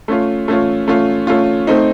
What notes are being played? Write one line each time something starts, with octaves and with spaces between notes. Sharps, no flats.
A3 C#4 F4
A3 C#4 F4
A3 C#4 F4
A3 C#4 F4
A3 C4 D#4